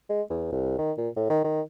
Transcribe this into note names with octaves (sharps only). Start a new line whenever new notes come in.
G#3
E2
C2
D#3
A#2
A2
D#3
D#3